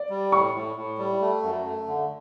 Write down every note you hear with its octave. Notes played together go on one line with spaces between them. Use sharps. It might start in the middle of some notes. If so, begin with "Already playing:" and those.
Already playing: D5
G3
A2 C#6
A2
A2
G3
A3
F#2
A3
D3